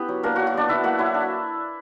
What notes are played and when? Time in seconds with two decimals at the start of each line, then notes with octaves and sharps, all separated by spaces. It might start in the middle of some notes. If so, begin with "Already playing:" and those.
Already playing: B3 C#4 E4 G4
0.08 F#3
0.23 A#3 D4 A#4
0.36 F#3 F#4
0.47 F#4
0.54 B3 D4 D5
0.69 F#3 E4 E5
0.83 A#3 F#4 F#5
0.99 F#3 E4 E5
1.14 D4